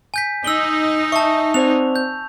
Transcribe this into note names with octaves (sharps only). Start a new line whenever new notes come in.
G#5 G6 B6
D#4 E6 F#7 G7
E5 A5 C#6
C4 C5 D5 F7
G6